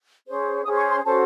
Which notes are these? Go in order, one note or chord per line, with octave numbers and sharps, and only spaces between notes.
C#4 G#4 C5
C#4 G#4 C5 D#6
C#6
C6
C#4 F#4 A4 C5 A5